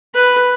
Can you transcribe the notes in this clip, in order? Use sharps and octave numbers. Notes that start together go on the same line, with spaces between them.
B4